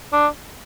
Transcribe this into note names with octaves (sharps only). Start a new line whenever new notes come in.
D4